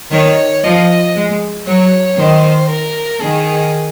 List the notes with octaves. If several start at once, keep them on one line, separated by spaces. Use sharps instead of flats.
D#3 C#5
F3 D#5
G#3
F#3 C#5
D#3 C5
A#4
D#3 G#4